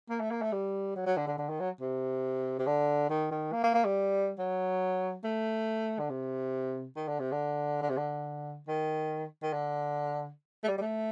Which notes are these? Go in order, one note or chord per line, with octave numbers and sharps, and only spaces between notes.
A#3
A3
A#3
A3
G3
F#3
F#3
D3
D3
D3
D#3
F#3
C3
C3
D3
D#3
D#3
A#3
A#3
A#3
G3
F#3
A3
D3
C3
D#3
D3
C3
D3
D3
C3
D3
D#3
D#3
D3
A3
G3
G3
A3